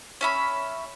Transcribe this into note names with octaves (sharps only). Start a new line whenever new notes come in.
C#4 E5 B5